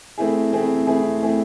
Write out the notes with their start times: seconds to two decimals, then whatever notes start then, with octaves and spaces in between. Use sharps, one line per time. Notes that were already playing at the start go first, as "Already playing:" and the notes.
0.18 A3 C4 E4 G#4
0.52 A3 C4 E4 G#4
0.87 A3 C4 E4 G#4
1.22 A3 C4 E4 G#4